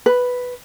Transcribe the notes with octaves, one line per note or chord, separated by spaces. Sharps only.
B4